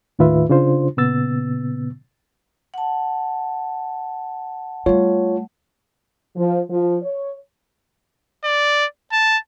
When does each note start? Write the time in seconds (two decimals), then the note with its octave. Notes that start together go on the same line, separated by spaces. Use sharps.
0.19 D#2 A2 D#3 F4 B4 E5
0.49 C#3 D4 F4 C5
0.97 A#2 C#3 B3 E6 A6
2.74 F#5 A5
4.86 G3 A3 F4 C#5
6.37 F3
6.70 F3
7.03 C#5
8.44 D5
9.12 A5